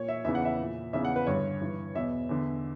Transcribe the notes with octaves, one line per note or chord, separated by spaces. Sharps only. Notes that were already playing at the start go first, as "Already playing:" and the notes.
Already playing: A#2 C#5
E5
E2 C#3 E3 E5
F#5
E5
A#2
E2 C#3 E3 E5
F#5
B4
G2 D3 C#5
G2 E3
E2 B2 E5
E2 D3